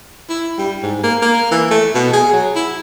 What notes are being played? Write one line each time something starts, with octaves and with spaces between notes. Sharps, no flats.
E4
G3
G#2
A#3
A#3
E3
A3
B2
G#4
F#3
E4